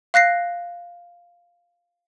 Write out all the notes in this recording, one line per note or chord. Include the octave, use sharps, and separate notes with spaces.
F5 F#6 A#6 C7